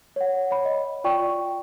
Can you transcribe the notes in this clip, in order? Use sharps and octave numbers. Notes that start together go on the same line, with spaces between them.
C#5 F#5
C#5 B5
D#5
F4 D5 G5 C#6